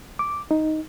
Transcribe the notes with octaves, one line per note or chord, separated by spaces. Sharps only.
D6
D#4